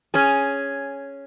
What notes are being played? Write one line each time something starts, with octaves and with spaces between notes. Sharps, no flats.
C#4 G#4